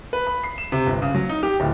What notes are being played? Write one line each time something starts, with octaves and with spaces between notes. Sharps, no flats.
B4
B5
C7
E7
C3
G1
C#3
F#3
D#4
G4
D1